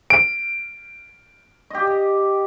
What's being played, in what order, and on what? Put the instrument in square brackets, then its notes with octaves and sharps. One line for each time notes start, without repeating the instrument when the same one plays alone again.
[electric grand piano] D7
[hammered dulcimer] G4 D#5